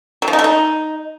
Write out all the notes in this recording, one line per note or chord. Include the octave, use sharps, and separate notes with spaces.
F#3
F3
D#4
A3
D#4